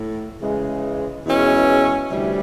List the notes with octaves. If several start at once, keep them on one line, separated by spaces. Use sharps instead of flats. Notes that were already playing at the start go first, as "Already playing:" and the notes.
Already playing: A2
C#3 E3 G#3
E2 B2 G#3 C#4 E4
D2 C3 E3 G3